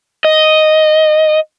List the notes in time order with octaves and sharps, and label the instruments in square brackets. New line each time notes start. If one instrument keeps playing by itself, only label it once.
[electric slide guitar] D#5